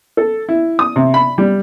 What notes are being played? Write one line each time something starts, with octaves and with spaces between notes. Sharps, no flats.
A4
E4
D#6
C3
B5
G3